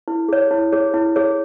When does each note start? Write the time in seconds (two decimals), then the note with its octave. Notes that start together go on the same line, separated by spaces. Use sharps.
0.08 E4
0.29 G#4 C#5
0.51 E4
0.72 G#4 C#5
0.94 E4
1.16 G#4 C#5